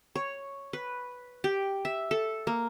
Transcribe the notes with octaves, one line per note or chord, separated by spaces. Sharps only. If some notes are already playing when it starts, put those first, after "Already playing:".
C#5
B4
G4
E5
A4
A#3